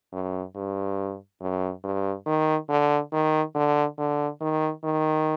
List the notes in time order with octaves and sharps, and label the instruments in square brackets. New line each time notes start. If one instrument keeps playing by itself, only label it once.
[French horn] F#2
G2
F#2
G2
D#3
D3
D#3
D3
D3
D#3
D#3